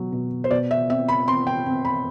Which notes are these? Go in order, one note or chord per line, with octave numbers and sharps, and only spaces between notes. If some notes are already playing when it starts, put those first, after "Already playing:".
Already playing: B2 F#3
B2
C5
B2 D5
E5
C4 E5
B5
C4 C6
G5
C4
B5